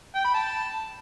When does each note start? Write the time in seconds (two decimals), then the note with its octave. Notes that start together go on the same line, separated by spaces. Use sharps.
0.15 G5
0.24 B5
0.34 A5